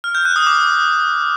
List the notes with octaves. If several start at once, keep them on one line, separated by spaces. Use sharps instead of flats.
F6
G6
F#6
D#6
D6